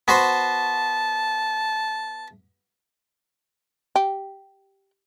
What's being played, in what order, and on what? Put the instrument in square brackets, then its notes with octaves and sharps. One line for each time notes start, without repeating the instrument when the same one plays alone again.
[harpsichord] B3 F#4 C5 [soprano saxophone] A5
[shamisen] G4